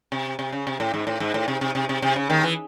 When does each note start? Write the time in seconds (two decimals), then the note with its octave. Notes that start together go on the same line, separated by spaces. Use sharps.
0.12 C3
0.39 C3
0.52 C#3
0.67 C3
0.80 A2
0.94 G#2
1.07 A2
1.20 G#2
1.34 A2
1.48 C3
1.61 C3
1.75 C3
1.89 C3
2.02 C3
2.16 C#3
2.29 D#2 D#3
2.43 E3